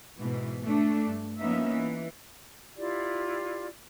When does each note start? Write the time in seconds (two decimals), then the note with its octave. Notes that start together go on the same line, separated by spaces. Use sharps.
0.19 G#2 B2 E3
0.63 A3 D4
1.06 G2
1.38 F3 A#3 B3 C#4 D#4 E5
1.69 E3
2.76 E4 F4 G4 D5